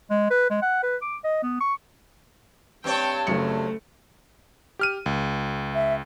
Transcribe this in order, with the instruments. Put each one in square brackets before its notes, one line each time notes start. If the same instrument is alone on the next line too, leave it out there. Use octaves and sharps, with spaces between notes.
[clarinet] G#3
B4
G#3
F#5
B4
D6
D#5
B3
C#6
[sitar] G2 C4 C#5 [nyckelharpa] G5 A5
[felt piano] F#1 F#2 C#7 [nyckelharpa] A3
[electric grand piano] G4 F6 D#7
C#2
[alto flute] E5